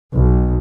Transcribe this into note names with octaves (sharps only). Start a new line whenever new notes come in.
B1